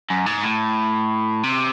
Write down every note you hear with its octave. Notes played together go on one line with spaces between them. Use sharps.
F#2
G#2
A2
C3